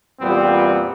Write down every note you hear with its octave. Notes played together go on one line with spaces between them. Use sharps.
E2 A#2 G3 B3 C4 F4